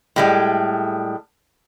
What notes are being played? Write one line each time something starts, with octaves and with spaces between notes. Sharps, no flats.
A2 G3 G#3